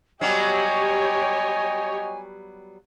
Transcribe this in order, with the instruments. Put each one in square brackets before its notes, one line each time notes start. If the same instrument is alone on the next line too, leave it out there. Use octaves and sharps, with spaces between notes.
[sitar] F#3 G3 B3 [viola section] G4 C#5 [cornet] D#5 [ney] G#5